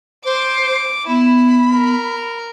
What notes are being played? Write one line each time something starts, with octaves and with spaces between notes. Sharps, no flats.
C5 D6
B3 E4 B5
A#4